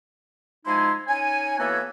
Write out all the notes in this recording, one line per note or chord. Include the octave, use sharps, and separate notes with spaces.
F3 G#3 D#4 E4 G#5 C6
C#4 D#4 C#5 G#5
E3 A#3 B3 F#4 A4 C#5